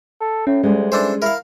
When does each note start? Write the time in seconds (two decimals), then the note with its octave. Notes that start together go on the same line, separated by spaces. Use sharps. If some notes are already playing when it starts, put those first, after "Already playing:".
0.20 A4
0.47 A2 C#4
0.63 D2 G3 G#3
0.92 E3 D4 A4 C5
1.22 E4 A#4 F5